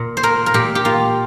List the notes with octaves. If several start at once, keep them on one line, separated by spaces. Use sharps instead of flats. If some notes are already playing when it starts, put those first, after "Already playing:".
Already playing: A#2
C5
A#3 A#4
A#4
A#2 G4
G4
A#3 F4